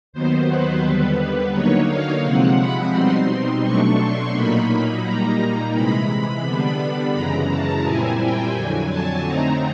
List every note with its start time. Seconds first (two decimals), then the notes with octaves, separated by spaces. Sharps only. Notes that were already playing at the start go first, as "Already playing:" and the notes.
0.13 D#2 D#3 F#3 B3 C5
0.49 B4
0.83 D#2 D3 G3 B3
1.18 B4
1.53 D3 F#3 A#3 D#4 C#5
1.88 F5
2.23 C3 F3 G#3 C4 F#5
2.59 B5
2.93 B2 G3 C4 D#4 C6
3.28 C6
3.63 B2 F#3 A3 D4 C#6
3.99 C6
4.34 A#2 F#3 A#3 D#4 B5
5.04 A#2 G3 A#3 D#4 A#5
5.39 A#5
5.74 C3 E3 G#3 B5
6.44 D3 G3 B3 D4 B5
7.14 F#2 C#3 E3 G#3 A#5
7.49 A5
7.84 A#2 G3 C4 E4 G#5
8.20 G5
8.54 F2 D3 F#3 G#5
8.90 A5
9.24 D3 F#3 A3 C4 D#4 A#5